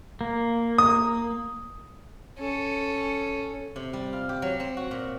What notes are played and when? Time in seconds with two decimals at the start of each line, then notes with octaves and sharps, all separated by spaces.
0.21 A#3
0.78 D#6
2.39 C#4 A4
3.76 C3
3.93 G3
4.13 F4
4.29 G4
4.42 F#3
4.60 C4
4.77 F#4
4.91 A#2